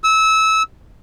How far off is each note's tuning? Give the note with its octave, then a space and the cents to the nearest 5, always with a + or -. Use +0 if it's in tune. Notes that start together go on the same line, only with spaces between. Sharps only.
E6 -25